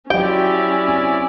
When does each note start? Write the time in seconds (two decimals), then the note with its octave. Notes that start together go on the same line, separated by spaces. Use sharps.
0.10 F#3 C#4 E4 F4 G4 D5 G5
0.88 C4